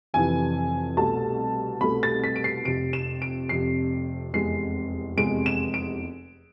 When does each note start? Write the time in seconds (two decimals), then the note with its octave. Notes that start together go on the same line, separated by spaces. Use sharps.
0.14 F1 F2 C3 E3 G#5
0.97 C2 B2 A3 A5
1.81 C2 B2 A3 B5
2.03 A6
2.24 B6
2.36 D7
2.44 C7
2.65 F1 F2 C3 D7
2.93 E7
3.22 D7
3.49 F1 F2 C3 C7
4.33 F1 E2 C3 G#3 C7
5.17 F1 E2 C3 G#3 D7
5.46 E7
5.74 D7